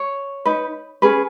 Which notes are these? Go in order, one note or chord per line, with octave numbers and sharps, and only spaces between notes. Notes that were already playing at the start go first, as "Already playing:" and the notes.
Already playing: C#5
D#4 B4
C#4 G#4 B4